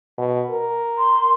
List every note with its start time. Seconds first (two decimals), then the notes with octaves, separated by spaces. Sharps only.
0.18 B2
0.51 A#4
0.98 C6